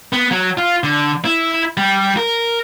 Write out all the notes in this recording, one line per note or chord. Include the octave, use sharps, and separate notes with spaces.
B3
F#3
F4
D3
E4
G3
A#4